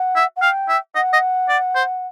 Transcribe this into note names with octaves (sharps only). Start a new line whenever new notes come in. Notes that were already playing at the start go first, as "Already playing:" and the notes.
Already playing: F#5
E5
F#5
F5 G5
E5
D#5 F#5
D#5
D5
C5